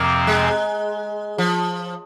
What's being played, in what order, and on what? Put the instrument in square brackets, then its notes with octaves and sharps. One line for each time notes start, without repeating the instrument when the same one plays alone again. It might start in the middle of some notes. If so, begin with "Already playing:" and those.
Already playing: [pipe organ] F2 C3 F3 C4 [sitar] A#3
[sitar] G#3
F3